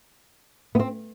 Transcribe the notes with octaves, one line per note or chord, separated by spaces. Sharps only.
B3
C4